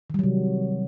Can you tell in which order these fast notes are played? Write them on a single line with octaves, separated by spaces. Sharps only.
D#3 G3 F#3 C3